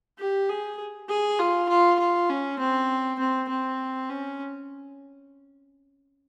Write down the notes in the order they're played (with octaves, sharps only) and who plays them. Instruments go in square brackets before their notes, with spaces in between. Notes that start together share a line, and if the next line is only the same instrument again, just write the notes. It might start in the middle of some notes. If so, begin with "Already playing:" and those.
[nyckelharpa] G4
G#4
G#4
F4
F4
F4
C#4
C4
C4
C4
C#4